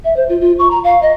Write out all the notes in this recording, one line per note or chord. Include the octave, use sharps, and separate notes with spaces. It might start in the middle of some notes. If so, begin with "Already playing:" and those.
E5
C5
F4
F4
C#6
A#5
F5
D#5